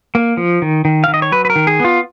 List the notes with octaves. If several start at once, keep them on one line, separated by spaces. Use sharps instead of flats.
A#3
F3
D#3
D#3
D#3 F5
D#5
C#5
F#3 B4
B4
A#4
D#3
G#4
B3 F4